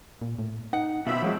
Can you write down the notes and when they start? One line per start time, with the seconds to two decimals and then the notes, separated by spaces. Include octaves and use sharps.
0.21 A#2
0.38 A2
0.73 D#4 F#5
1.07 B2 B3 C4 F4 E5 B5
1.22 F3 F#3 G#3 A#3 C4